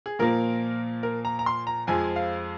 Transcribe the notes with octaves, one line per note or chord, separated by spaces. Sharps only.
G#4
A#2 F3 A#3 A#4
A#4
A#5
A#5
C6
A#5
F2 F3 G#3 G#5
F5